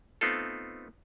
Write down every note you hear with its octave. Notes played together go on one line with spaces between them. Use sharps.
A3 B3 C4 D#4 F4 A4